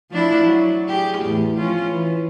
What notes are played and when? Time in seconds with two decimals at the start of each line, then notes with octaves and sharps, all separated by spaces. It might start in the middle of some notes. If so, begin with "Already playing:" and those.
0.11 F3 D4 E4
0.45 F#3
0.88 G4 G#4
1.21 E2 A2
1.57 F3 C#4 F4
1.88 E3